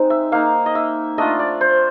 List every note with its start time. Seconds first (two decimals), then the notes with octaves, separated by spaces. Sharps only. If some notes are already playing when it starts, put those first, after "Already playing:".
Already playing: G#3 C4 D#4
0.10 E5
0.32 A#3 D#4 F5
0.66 D#5
0.75 E5
1.18 A3 D4 F4 D#5
1.39 D5
1.61 C5